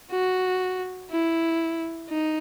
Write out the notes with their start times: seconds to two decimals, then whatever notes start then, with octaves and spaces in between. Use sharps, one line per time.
0.11 F#4
1.11 E4
2.10 D#4